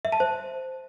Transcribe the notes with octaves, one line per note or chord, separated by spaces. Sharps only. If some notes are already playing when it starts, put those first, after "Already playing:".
E5
A5
C5